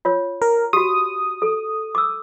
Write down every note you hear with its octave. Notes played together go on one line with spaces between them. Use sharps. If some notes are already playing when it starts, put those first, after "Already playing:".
F4 C#5
A#4
F#4 G4 D#6
A4
D6 E6